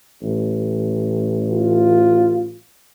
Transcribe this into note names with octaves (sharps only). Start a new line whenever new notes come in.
A1
F4